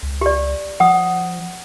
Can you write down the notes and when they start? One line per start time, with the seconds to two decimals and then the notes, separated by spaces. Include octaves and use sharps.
0.03 C#2
0.21 G4 D5
0.80 F3 F#5 D#6